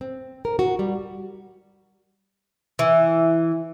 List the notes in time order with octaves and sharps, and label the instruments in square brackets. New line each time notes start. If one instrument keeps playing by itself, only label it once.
[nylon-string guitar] C4
A#4
F#4
G3
[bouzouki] E3